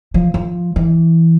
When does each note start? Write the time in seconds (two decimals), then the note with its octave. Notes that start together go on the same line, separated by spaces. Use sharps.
0.14 F3
0.34 F3
0.76 E3